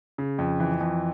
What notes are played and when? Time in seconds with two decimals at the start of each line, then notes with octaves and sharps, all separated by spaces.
0.18 C#3
0.38 F2
0.60 E3
0.81 F2